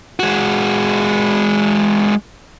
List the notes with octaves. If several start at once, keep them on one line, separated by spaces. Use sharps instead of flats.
G#3 F#4